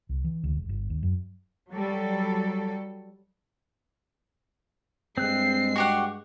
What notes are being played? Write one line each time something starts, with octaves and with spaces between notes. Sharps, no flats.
C2
E3
D2
E1
G1
D#2
F#2
F#3 G3 A4
G2 G#3 C4 F#6 C7
F#4 G4 F#5 C#6